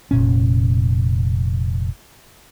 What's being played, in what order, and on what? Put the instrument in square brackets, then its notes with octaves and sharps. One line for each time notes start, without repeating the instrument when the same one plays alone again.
[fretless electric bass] F1 A#2 C#4